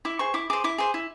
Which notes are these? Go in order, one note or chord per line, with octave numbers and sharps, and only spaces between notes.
E4 D6
G#4 C5 C#6
E4 D6
G#4 C5 D6
E4 D6
G#4 C5
E4